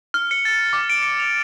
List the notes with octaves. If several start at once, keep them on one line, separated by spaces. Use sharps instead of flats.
F6
C#7
A6
D6
D7
C#7
F7